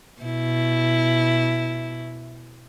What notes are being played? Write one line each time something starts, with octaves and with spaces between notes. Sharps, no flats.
B2 E4